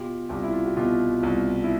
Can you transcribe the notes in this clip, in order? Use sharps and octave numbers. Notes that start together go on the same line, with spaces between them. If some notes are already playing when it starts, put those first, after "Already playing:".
Already playing: B2 F4 G4
C2 F4 G4
E4
F4
F#4
B2 F4 G4
C2
E4